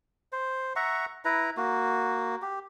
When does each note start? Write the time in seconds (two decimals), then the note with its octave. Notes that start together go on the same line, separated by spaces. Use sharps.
0.32 C5
0.76 E5 F#5 A#5 C#6
1.25 E4 B4 A#5
1.57 A#3 F#4
2.42 G4